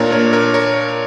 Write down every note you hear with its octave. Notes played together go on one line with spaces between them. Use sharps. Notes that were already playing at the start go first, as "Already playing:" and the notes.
Already playing: A#2 A#3 D4 A#4 C#5
A#4 C#5
A#4 C#5
A#4 C#5